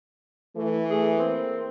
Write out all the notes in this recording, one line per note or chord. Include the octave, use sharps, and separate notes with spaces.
E3 A3
A3 G#4
A#3 C4